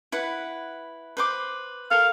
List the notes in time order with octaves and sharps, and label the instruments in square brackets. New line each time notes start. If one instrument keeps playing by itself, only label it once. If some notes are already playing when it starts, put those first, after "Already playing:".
[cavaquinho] E4 B4 F#5
B4 C5 D6
[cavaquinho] A4 A#4 [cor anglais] F5